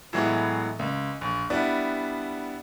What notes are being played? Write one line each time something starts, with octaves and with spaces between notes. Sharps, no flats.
A2 E3 F#3 G#3 B3
C#2
A#1
G3 B3 D4 E4